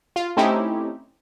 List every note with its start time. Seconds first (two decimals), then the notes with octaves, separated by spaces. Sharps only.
0.16 F4
0.37 A3 C4 C#4 D#4 E4 G4